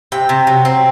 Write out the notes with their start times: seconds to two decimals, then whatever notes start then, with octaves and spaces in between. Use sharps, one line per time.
0.12 C3 G5
0.29 C3
0.47 F#3
0.65 C4